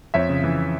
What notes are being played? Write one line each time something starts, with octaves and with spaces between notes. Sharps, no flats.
F2 C#5 E5
C#3
E3